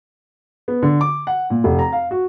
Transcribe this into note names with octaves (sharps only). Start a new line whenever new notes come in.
B3
D3
D6
F#5
A#2
F1
A#5
F5
F#4